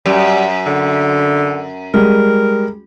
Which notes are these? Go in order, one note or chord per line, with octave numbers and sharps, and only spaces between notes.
F#2 G3
D3
G3 G#3 A#4